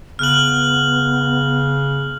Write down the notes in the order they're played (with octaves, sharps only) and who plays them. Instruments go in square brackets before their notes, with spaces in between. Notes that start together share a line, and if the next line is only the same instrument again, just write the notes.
[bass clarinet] C#3 [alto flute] B3 [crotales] F6 F#6 F#7